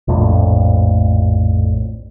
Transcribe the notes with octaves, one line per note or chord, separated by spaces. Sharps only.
A#1 F2 A2